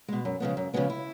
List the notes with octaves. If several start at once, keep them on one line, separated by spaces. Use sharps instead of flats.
B2 G#3
F#2
C#3 F3 G#3 B3
F#2
C#3 F3 G#3 B3
E4